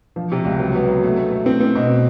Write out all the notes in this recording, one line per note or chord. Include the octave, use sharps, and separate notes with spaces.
F3
C3
C#2
F#3
B3
F#3
A3
A3
A3
C4
C4
B2